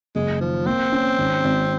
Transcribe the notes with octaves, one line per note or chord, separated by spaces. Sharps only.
F#1 G#3
D#3 F3
A#3 C4
C#4
G#1
G#1